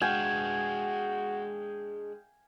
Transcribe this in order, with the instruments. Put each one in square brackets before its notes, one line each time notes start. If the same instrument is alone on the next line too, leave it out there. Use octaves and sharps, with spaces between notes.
[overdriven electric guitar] G#3 D4 [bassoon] F#4 [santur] F5 G5 G#5